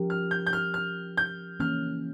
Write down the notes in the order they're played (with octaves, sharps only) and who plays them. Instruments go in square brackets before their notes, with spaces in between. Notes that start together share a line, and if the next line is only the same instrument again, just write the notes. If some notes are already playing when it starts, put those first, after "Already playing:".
Already playing: [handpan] F3 C#4 G4 A#4
[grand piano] F6
G6
G6
F6
F6
G6
[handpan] E3 A#3 C#4 [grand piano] F6